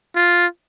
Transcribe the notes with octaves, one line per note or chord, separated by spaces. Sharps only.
F4